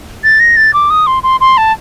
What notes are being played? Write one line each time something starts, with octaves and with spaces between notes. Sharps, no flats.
A6
A#6
A6
D6
D#6
C6
C6
C6
A5